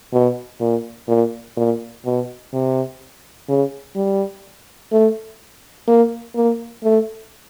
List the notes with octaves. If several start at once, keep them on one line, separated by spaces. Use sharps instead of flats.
B2
A#2
A#2
A#2
B2
C3
C#3
G3
A3
A#3
A#3
A3